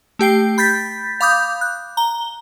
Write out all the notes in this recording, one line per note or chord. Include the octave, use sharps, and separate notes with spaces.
A3 G4 G5 C7
B5 G6 A6 B6
F5 B5 D6 D#6 G6
F#6
A#5 G7